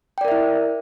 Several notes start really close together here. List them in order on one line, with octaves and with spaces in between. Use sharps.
G5 D5 A#4 E5 E4